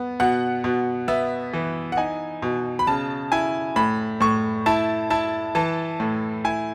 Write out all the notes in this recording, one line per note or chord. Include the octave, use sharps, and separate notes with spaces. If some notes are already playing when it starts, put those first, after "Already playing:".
Already playing: B3
B2 F#5
B2
B3 E5
E3
F#5
D#4 G#5
B2
B5
C#3 A5
E4 G#5
A2 B5
A2 C#6
E4 A5
E4 A5
E3 A5
A2
E4 G#5